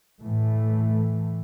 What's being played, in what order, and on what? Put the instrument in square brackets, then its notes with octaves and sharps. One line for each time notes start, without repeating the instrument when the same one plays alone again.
[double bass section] A2 E3 A3